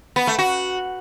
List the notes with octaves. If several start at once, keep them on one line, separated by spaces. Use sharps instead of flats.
B3
A3
F#4